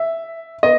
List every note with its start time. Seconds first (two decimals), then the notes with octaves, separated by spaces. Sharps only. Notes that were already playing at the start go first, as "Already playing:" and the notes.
Already playing: E5
0.63 B3 D#5